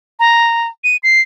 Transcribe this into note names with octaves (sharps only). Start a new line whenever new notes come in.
A#5
D#7
C7